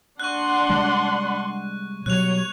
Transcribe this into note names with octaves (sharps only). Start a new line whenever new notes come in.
D4 F#5 C6 C#6 F#6
C3 G3 G#3
B2 F#3 G3 C#5 F#6 F7